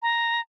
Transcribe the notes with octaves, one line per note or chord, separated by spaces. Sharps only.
A#5